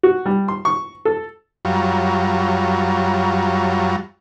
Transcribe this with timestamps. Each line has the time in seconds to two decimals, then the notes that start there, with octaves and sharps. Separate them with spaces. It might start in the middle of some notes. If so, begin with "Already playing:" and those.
0.03 F#4
0.26 G3
0.48 C6
0.65 C#6
1.05 A4
1.65 F#2 F#3 G3 F4 C#5 A#5